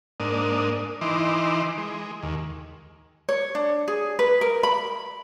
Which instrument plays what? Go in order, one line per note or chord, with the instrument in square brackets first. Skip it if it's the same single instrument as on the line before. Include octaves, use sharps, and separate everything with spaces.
[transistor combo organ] G#2 A#3 D4 D#6
E3 D#4 C6 D6
G#3
D#2
[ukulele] C#5
D4
G#4
B4
A#4
B5